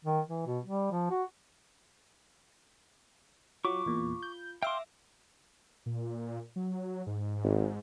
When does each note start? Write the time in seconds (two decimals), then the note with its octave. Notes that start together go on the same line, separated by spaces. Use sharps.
0.05 D#3
0.29 E3
0.46 B2
0.66 G3
0.91 F3
1.10 F#4
3.65 F#3 F4 C#6 D6
3.86 E2 A#2
4.23 G6
4.63 E5 F5 G5 C6 D6 E6
5.86 A#2
6.56 F#3
7.07 G#2
7.44 G#1